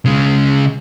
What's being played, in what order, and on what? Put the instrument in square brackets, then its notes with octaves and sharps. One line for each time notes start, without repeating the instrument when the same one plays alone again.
[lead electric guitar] C#3 G#3